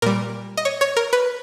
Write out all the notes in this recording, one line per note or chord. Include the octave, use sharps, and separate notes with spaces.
A#2 G3 A#4
D#5
C#5
C#5
A#4
B4